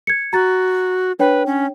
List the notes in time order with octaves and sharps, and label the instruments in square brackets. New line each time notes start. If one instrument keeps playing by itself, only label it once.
[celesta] G#6 C#7
[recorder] F#4 [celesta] A#5 A6
[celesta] D4 C#5 G5 [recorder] B4
[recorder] C#4